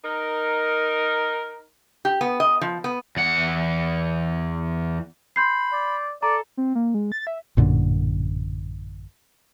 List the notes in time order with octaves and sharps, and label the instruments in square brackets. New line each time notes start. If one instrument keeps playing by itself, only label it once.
[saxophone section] D#4 A#4
[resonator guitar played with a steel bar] G4
B3
D#5
F3
B3
[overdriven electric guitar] E2 F#5
[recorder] B5 [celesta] C6 G6 C7
[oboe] D5
[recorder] A4 [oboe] D5 [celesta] A#5
[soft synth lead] C4
A#3
G#3
A6
E5
[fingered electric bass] A1 F#2 A#2 D3